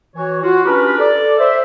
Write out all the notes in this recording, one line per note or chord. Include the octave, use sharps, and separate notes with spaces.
E3 F#4 C#5
F4 F#4
C#4 D4 F4 G4 A#4 B4
A4 D5
C5 E5